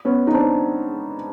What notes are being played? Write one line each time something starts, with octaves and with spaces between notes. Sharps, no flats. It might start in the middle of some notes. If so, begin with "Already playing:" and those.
B3 C#4
D#4
C4 D4